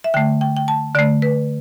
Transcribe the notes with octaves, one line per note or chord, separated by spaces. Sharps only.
E5
D3 A3 G5
G5
G5
A5
D3 A3 D5
B4